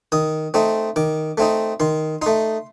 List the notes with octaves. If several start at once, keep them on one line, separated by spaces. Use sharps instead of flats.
D#3 D#6
A3 C4 D#4
D#3 D6
A3 C4 D#4
D#3 C6
A3 D#4 C6